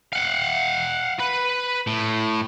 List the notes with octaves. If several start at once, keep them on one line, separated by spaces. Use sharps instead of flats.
F5 F#5
B4
A2